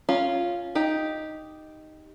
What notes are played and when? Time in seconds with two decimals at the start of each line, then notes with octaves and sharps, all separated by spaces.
0.09 C#4 F4
0.75 D#4 G4